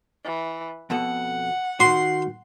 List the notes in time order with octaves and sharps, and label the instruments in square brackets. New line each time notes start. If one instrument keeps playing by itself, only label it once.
[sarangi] E3
[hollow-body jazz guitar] F2 B2 A4 [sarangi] F#5
[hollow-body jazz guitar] D#3 F#4 [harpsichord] C6